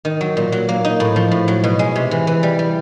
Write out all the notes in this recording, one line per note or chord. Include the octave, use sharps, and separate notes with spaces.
D#3
F#3
A#2
F#3
A#3
D#4
A2
F3
A2
F#3
B2
G#3
C3
E3
E3
G3
G3